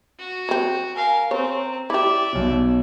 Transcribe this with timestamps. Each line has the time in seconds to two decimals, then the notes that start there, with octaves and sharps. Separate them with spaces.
0.19 F#4
0.49 F#3 C4
0.96 A#4 F5 G#5
1.31 C4 C#5 A#5
1.90 E4 G4 D5 E5 D6
2.33 B1 B2 C#5